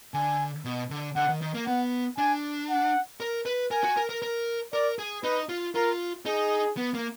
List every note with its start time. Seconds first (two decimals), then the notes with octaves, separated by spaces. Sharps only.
0.14 D3 G#5
0.65 B2
0.90 D3
1.16 D3 F#5
1.29 D#3
1.41 D#3
1.54 A#3
1.67 B3 F#5
2.18 D4 G#5
2.70 F#5
3.20 A#4
3.46 B4
3.71 A#4 G#5
3.83 F#4
3.97 A#4
4.09 A#4
4.22 A#4
4.73 A#4 D5
4.99 G#4
5.23 D#4 B4
5.49 F4
5.75 F4 A#4
6.26 D#4 G#4
6.77 B3
6.94 A#3